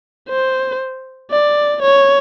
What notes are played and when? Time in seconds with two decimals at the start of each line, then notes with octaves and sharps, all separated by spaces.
0.29 C5
1.31 D5
1.82 C#5